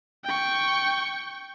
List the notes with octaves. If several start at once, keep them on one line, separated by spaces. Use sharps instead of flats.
G5 C#6